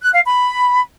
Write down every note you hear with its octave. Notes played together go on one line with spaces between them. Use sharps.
F#6
F5
B5